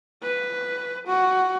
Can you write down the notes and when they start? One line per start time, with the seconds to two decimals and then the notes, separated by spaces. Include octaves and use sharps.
0.23 B4
1.07 F#4